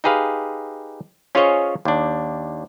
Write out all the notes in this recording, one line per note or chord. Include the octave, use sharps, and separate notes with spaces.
D#4 G4 G#4 B4 F5
C#4 F4 G#4 C5 C#5 D#5
D#2 D4